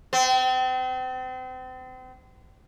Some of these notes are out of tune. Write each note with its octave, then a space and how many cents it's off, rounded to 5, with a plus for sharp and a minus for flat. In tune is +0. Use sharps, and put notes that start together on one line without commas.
C4 -35